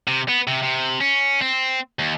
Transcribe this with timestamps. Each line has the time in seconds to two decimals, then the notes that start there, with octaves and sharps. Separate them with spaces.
0.08 C3
0.28 B3
0.47 C3
0.63 C3
1.01 C#4
1.41 C4
1.99 D#2